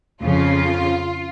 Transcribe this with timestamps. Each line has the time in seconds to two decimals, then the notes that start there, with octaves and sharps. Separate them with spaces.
0.22 F2 C#3 F3 F4